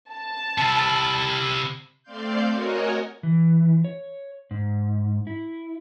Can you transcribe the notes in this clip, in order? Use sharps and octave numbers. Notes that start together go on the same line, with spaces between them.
A5
C3 E4
A3 C4 D5 F5 C6 G6
F#4 A#4 C#5 D#5 F#5 G#5
E3
C#5
G#2
E4